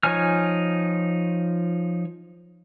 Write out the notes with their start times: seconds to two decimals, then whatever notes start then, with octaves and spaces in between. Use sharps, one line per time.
0.03 F3 D#4 C#5 G#5 F6